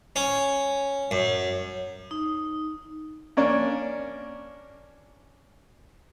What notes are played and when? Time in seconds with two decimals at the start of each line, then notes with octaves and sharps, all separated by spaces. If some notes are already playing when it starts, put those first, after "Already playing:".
0.16 C#4
1.11 F#2
2.11 D#4
3.37 A#3 C#4 D4